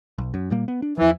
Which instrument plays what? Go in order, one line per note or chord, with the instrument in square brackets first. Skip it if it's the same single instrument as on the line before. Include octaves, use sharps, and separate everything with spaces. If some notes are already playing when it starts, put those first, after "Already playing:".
[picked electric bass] B1
F#2
A#2 G3 A#3
B3
D4
[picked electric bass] E2 F3 [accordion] E3